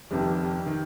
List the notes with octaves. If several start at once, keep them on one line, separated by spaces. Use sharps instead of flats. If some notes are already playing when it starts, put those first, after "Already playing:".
F1 F2 C3 D#3 G4
D#3